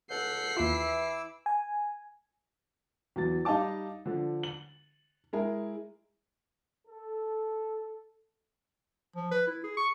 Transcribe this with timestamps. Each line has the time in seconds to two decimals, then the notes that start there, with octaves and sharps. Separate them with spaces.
0.10 C#2 A4 F#5 G6 B6 C7
0.57 D#2 E3 E4 F4 D6 E6
1.46 G#5
3.16 E2 F#3 A6
3.45 G3 D#4 D#5 F5 A5 D6
4.06 D3 F3 D4
4.43 F#7
5.33 G#3 E4 G#4 A#4
6.87 A4
9.16 F3
9.31 B4
9.47 E4
9.64 G#4
9.77 C#6